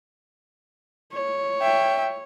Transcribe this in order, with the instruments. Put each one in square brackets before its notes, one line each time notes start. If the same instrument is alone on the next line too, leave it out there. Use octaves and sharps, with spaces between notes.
[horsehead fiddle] C#5
[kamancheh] E5 G5